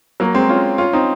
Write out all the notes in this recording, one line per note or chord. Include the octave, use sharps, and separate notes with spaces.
F#3 A#3
G#3 C4
C#4 F4
C#4 F4
C4 D#4